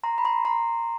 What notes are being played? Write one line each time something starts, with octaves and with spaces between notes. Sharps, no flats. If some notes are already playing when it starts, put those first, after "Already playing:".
A#5 C6
B5
A#5 C6
A#5 C6